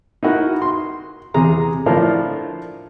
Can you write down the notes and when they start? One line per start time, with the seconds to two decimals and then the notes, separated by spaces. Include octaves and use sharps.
0.23 D#4 E4 F#4 A#4
0.62 C6
1.34 E2 C3 G#4 A#5
1.86 A2 F3 D4 F4 A#4 E5